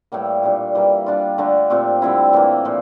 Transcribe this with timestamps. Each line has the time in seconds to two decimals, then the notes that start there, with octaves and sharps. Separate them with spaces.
0.12 A2 E3 G3 A#3
0.43 A#2 G3 D4
0.75 E3 G3 A#3 E4
1.06 G3 D4 F4
1.38 D3 A3 D4
1.70 A#2 A3 C4 G4
2.02 D3 G3 C4 E4
2.33 A2 E3 A#3
2.65 A#2 F3